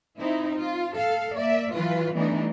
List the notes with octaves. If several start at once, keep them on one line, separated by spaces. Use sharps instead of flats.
C4 D#4 E4
F4
A4 F5
A#3 D5 E5
E3 F#3 F4 B4
E3 G3 A3 B3 D4 D#4